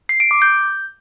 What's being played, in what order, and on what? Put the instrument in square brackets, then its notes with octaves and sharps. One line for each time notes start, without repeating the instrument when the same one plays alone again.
[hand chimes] C7
D7
D6
G6